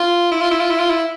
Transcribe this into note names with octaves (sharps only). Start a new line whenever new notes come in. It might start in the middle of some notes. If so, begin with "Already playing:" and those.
Already playing: F4
E4
F4
E4
F4
E4
F4
E4